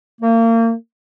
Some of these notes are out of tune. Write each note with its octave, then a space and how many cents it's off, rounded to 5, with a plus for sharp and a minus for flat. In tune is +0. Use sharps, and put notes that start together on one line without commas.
A#3 -35